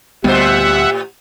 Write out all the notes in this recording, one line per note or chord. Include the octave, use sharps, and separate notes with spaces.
D2 A2 G3 B3 G4 C5 E5 F#5